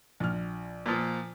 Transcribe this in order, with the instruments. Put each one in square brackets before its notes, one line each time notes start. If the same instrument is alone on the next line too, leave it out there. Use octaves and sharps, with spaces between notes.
[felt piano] A#1 F6
[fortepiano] A#2 F3